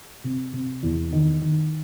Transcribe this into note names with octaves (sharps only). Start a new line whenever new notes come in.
C3
C3
E2
D#3
D#3